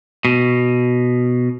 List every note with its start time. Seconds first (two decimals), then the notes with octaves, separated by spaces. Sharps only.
0.25 B2